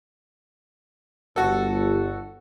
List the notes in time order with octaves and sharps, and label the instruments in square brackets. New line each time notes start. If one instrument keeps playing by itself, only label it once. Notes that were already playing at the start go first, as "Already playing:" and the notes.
[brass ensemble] G1 [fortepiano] F#4 A4